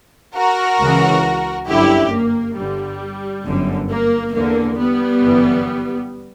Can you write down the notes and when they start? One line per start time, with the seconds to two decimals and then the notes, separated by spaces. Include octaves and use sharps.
0.36 F#4 A#4
0.80 C#2 C#3 E3
1.68 G1 F#2 D3 E4 G4
2.12 A#3
2.56 G1 G2 D3 G3
3.45 G1 F#2 D3
3.89 A#3
4.33 E2 D3 A#3
4.78 G3 B3
5.21 G1 F#2 E3